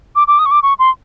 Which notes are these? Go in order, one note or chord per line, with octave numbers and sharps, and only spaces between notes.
D6
D6
D#6
C#6
D6
C#6
C6